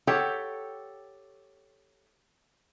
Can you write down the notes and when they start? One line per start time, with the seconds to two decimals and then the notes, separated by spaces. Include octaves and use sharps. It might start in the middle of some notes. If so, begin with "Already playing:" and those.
0.07 G4 A4 C#5 F#5 G5